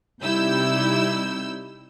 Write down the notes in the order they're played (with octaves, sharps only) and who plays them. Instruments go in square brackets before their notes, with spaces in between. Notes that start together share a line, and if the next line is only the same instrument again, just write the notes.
[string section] C3 G3 D#4 E4 E6 G6